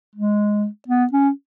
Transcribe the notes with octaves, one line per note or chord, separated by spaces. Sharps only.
G#3
B3
C#4